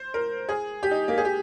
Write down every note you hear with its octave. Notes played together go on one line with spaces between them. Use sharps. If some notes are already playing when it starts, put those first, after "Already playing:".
Already playing: C5
A#4
G#4
G4
D#4
A#3
G#4
G4